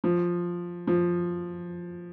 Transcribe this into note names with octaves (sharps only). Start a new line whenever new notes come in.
F3
F3